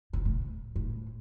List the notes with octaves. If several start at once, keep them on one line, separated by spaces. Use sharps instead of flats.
B2
A2
A2